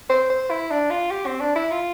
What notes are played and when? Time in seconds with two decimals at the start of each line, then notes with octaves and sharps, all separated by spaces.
0.10 C5
0.30 C5
0.50 E4
0.71 D4
0.90 F4
1.11 G4
1.26 C4
1.41 D4
1.56 E4
1.71 F4